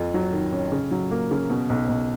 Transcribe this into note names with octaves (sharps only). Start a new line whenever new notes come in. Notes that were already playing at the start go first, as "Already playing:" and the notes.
Already playing: F2
F#3
D#3
C#4
C#3
F#3
A#3
C#3
B2
B1
B1